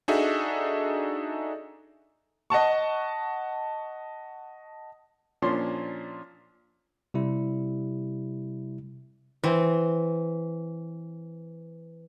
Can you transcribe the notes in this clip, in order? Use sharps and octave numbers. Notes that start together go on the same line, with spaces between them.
D4 D#4 F#4 G#4 A4 E5
D#5 F#5 A5 C#6
A#2 F3 C#4 D4 C6
C3 G3 E4
E3 C4